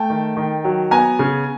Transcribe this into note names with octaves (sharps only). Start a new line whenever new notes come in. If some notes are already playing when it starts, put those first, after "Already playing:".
Already playing: A3 G5 A5
D#3
D#3
F#3
B3 G#5 A#5
C#3